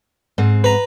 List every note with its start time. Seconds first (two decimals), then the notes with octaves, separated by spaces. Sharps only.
0.38 G#2 C4
0.64 B4 A#5